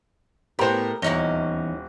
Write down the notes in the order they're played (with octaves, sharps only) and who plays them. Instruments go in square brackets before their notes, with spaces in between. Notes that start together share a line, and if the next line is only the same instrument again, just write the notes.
[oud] A2 B3 [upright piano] G4 C5 [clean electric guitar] A#4
[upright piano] D#1 A#6 G7 [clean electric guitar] E2 [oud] C#4 D#4 E4